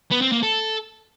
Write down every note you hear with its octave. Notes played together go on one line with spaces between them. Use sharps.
B3
C4
A#3
A4